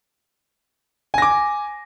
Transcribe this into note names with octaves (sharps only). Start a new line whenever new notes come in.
G#5 D6 A#6